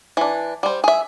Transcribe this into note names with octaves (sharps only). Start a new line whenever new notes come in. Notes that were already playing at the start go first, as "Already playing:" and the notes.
E3 D4
G3 C5
G#4 E5